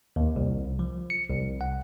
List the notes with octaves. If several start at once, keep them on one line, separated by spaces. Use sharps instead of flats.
D#2
C2
F3
C#7
C2
F#5